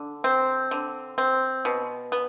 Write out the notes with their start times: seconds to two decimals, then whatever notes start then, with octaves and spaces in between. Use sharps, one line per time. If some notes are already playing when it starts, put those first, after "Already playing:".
Already playing: D3
0.24 C4
0.71 D3
1.18 C4
1.65 B2
2.12 B3